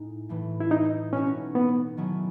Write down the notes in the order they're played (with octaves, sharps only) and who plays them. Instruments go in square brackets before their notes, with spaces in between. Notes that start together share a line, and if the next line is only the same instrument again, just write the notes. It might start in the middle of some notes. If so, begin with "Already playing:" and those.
Already playing: [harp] A2 G#3 D#4
A2 E3 A3
[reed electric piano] E4
D#4
[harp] B2 A3 D#4 F#4 [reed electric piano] C#4
[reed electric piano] B3
[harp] D#3 F#3 A3 E4 G#4